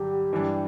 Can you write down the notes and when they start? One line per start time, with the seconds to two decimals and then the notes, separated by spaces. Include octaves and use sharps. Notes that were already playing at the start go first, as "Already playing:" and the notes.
Already playing: G2 D3 F#3 G4
0.32 G2 E3 G3 D4